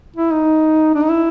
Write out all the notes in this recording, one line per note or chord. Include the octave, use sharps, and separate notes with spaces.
E4
D#4
D4
D#4
E4